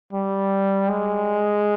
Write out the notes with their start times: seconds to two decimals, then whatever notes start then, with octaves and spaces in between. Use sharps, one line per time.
0.13 G3
0.89 G#3